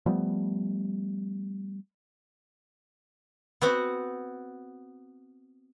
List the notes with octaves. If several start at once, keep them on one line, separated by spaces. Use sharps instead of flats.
F3 G3 A3 B3
B3 C4 F#4